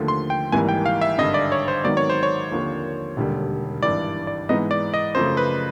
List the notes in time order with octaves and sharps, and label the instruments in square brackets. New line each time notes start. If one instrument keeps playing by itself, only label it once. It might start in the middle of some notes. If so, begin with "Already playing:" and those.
Already playing: [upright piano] D#2 D3 F3 A3
[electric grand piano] C6
G5
[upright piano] G#1 G#2 E3 G3 A#3 [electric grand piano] G#5
[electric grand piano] G5
F5
E5
[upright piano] G#1 G2 D3 [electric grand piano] D#5
[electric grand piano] D5
C#5
C5
[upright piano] G#1 G#2 D#3 F#3 B3 [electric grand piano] D5
[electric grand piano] C#5
C5
C#5
[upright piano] D#2 D3 F3 A#3
E1 D#2 D3 G3
[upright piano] G#1 G2 E3 [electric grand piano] D5
[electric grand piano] D5
[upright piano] G#2 E3 G#3 B3 D#4 [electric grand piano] D#5
[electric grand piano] D5
D#5
[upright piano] F#2 C#3 F3 A3 [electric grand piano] C5
[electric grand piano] B4